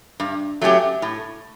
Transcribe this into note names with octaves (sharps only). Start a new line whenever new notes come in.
G2
F#3 A3 C#4 G4
A2